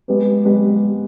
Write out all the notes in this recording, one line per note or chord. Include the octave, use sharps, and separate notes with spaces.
G#3 B3 G4 B4
G#3 B3 G4 B4